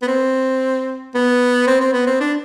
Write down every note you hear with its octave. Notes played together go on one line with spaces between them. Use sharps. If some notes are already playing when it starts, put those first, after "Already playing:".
B3
C4
B3
C4
C4
B3
C4
D4